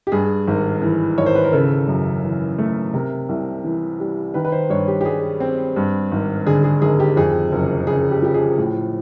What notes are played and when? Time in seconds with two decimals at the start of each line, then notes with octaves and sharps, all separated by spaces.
0.07 G4
0.12 G2 G#4
0.47 G#1
0.82 E3
1.18 G#1 C#5
1.26 C5
1.35 B4
1.45 A#4
1.53 C#3 A4
1.88 F#2
2.23 E3
2.58 A3
2.94 C3 A#4
3.29 C2
3.64 E3
4.00 G3
4.34 D#3 B4
4.45 B4
4.52 C5
4.69 G2 C#5
4.88 G4
5.01 G4
5.05 G3 G#4
5.40 C4
5.76 G2
6.12 G#1
6.46 D3 G#4
6.64 G#4
6.82 G#1 G#4
7.00 G4
7.17 F2 G#4
7.52 F#1
7.87 C#3 G#4
8.11 G4
8.22 F3 G4
8.34 G#4
8.58 A2